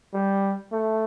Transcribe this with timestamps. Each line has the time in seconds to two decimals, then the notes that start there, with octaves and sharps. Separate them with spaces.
0.14 G3
0.73 A3